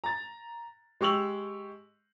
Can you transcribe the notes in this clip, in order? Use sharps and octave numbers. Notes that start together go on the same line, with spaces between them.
A#5 A6
G#3 G4 C#6 E6 F7 F#7